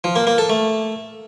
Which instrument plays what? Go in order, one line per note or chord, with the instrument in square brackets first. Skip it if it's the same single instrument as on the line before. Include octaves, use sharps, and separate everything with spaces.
[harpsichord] F3
A#3
A#3
A4
A3